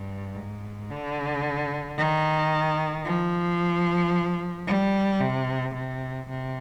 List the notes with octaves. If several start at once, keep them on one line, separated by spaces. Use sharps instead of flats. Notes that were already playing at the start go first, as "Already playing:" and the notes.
Already playing: G2
G#2
D3
D#3
F3
G3
C3
C3
C3